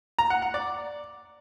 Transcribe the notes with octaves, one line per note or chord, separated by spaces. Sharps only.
A#5
F#5
F#5
D5